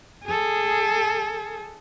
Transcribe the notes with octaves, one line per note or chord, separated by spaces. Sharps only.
G#4 A4